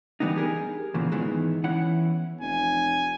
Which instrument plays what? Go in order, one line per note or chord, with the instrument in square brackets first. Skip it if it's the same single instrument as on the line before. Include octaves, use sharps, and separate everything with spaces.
[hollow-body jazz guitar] E3 G3 B3 D4 D#4
G4 G#4 A#4
E2 A#2 C#3 E3 F3
G#2 D#3 E3 G#3 B3
E2 E3 C#4 E4 F#5
[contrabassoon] F1 [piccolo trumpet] G#5